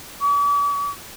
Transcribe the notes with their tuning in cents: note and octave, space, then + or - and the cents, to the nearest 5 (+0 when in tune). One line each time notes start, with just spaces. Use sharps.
D6 -45